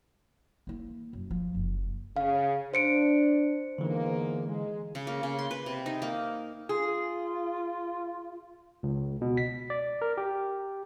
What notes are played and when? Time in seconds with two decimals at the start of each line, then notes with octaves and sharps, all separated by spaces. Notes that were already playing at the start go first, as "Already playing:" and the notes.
0.67 A#3 E4
1.13 F#2
1.31 F3
1.55 F#1
2.16 C#3 F5
2.74 D4 C5 C#7 D7
3.78 E2 G#2 D3 E3 A#3
4.46 G#3
4.95 C#3
5.07 A#3
5.23 C#3
5.39 C6
5.51 B4
5.66 C3
5.86 D#4
6.02 A#3
6.69 F4 G#4
8.83 C#2
9.21 B2
9.37 B6
9.70 D5
10.02 A#4
10.17 G4